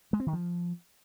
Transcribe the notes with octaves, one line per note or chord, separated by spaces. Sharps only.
G#3
C4
D#3
F3